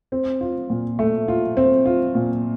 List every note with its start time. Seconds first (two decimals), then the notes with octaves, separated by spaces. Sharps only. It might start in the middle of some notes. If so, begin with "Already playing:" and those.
0.12 C4
0.41 F4
0.70 A#2
0.99 A3
1.28 F4
1.57 C4
1.86 F4
2.15 A#2